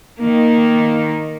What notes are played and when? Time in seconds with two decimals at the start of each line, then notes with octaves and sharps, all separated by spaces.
0.21 D#3 A#3